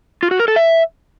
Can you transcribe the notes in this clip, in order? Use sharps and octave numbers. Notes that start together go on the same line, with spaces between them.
F4
F#4
A#4
A4
E5